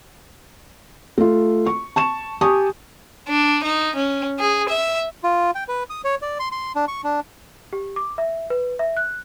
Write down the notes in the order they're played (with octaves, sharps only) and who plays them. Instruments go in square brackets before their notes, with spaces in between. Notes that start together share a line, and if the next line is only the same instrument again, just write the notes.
[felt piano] A3 F4
C#6
A5 C#6 E7
G4 G#5 A5 C#6 D#6
[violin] D4
D#4
C#4
G#4
E5
[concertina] F4
G5
B4
D#6
C#5
D5
C6
C6
D4
C#6
D4
[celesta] G4
D6
E5
B4
E5
F#6